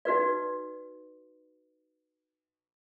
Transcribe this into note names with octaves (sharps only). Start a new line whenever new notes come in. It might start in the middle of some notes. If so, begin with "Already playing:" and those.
D#4 F#4 B4 D5